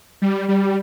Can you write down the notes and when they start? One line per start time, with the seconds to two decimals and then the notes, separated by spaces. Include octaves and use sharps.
0.22 G3
0.48 G3